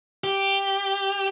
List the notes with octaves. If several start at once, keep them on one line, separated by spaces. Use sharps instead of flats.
G4